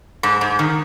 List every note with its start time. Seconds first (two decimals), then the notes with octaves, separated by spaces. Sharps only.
0.23 G#2
0.41 G#2
0.59 D#3